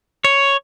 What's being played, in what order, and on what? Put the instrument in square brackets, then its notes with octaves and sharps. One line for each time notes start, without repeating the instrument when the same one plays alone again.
[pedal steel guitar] C#5